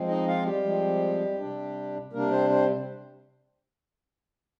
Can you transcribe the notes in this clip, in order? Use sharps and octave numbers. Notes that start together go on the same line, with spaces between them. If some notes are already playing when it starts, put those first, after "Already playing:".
Already playing: F3 G#3 C4
D#4 D#5
F4 F5
G3 G4
F3 G#3 C4
C3 G3 D4
C3 G3 A#3 D4 A#4
C4 C5
C4 C5